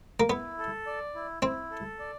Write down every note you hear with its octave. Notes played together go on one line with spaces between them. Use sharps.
A#3
B3 E4
A4
D5
E4
C4 E4
A4
D5